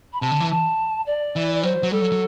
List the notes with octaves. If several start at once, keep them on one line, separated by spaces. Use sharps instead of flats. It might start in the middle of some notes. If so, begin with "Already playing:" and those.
B5
C3 A5
D3
E3
A5
D5
E3
D5
F#3 C5
F#3
G3 A4
F#3
F#3